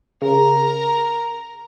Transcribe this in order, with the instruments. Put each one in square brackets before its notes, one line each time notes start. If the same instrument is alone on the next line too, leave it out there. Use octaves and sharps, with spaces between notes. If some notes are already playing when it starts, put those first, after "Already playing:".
[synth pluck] C#3 [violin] A#4 A#5